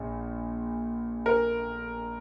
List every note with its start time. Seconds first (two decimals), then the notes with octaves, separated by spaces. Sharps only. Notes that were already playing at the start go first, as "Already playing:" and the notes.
Already playing: A#1 A#2
1.26 A#4